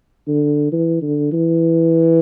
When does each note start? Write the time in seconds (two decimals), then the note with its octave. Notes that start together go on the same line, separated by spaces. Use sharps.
0.28 D3
0.72 E3
1.02 D3
1.32 E3